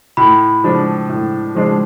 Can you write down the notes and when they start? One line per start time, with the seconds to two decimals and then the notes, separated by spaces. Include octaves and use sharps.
0.17 A2 B5
0.64 F3 G#3 D4
1.09 A2
1.55 F3 G#3 D4